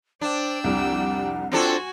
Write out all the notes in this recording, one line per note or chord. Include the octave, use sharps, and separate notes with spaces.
D4 C5 D5 G5 E6
C2 F2 G3 F#5
C4 D4 F4 F#4 A4 G#5